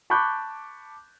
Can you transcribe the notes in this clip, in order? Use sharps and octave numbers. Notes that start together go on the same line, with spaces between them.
A5 B5 C#6 D6 F#6 G6